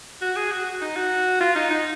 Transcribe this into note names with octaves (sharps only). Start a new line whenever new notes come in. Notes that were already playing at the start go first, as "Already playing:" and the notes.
F#4
G#4
F#4
D#4
F#4
F4
D#4
D#4